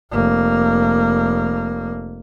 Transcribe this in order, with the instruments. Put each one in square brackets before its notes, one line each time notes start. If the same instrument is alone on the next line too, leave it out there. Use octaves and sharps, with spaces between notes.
[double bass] F1 A#3